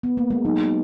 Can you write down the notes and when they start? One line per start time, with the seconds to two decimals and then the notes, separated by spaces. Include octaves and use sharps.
0.03 B3
0.17 A#3
0.30 G#3
0.45 F#3 D#4